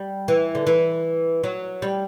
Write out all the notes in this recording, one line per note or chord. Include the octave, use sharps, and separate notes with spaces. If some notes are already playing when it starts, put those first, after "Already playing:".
Already playing: G3
E3
D3
E3
F#3
G3